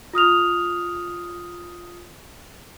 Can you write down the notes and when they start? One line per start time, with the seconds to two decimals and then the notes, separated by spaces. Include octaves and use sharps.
0.14 F4 D#6 F6 F7